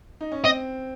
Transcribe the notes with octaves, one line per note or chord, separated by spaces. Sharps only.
D#4
C#4
C4 D#5